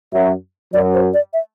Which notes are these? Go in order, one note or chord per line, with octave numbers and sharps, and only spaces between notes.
F#2 F#3 E5
F#2 F#3 D5
C5
D5
E5